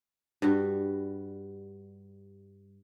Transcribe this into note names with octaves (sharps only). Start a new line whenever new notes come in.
G2 G3 F#4